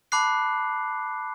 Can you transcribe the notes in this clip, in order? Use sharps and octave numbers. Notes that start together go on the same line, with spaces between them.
A5 B5 D6 F#6 C7